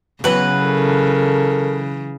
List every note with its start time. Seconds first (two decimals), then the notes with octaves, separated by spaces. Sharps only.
0.24 C#3 E3 F#3 B3 F#4 B4 F#5
0.63 A4 A#4